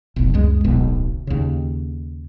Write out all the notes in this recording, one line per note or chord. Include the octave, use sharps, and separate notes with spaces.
F1 B1
C#2 F#2 G#3
D1 B1 B2
D#2 C#3